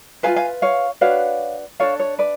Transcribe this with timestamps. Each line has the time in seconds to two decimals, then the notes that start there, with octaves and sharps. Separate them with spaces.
0.23 F4 G#4 B4 F5 G#5
0.36 F5 G#5
0.62 C#5 F5
1.01 D4 F#4 B4 C#5 F5
1.79 D4 F4 A4 C#5 F5
2.00 C#5
2.19 B4 D5